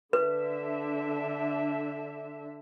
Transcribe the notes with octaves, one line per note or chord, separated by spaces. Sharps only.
D3 D4 B4 E5